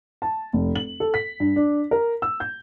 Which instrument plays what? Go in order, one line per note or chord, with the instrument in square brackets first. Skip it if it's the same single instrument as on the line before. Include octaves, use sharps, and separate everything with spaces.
[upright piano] A5
F1
F#7
A4
B6
G2
D4
A#4
E6
G6